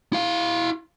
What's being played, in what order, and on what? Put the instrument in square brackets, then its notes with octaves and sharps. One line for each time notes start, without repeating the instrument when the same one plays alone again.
[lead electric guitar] E4 F5